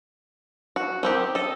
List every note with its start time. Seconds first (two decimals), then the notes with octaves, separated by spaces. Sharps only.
0.76 F#4
1.03 D#3 C4 G4
1.35 A4 D#5